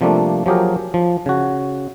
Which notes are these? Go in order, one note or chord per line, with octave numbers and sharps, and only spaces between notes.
C3 F3 G3 A3 A#3 D4
F3 F#3 G4 G#4 A#4
F3
C#3 F#4